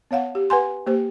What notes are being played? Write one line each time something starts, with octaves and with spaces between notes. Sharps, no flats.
B3 C#5 F5 F#5
G4
B4 F#5 G#5 C6
A#3 G4 C5